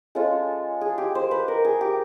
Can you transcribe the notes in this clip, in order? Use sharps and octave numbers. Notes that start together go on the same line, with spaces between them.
G#3 C#4 F4 A4
G#4
G4
C5
B4
A#4
G#4
G4